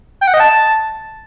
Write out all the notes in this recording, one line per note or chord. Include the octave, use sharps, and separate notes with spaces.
G5
F#5
D#5
A5